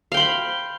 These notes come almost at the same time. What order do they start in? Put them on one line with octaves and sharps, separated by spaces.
F5 G5 C6 B5